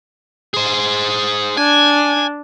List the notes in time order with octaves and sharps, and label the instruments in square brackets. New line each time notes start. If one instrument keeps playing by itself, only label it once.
[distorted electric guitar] G#4 C5
[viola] D4 [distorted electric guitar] G#5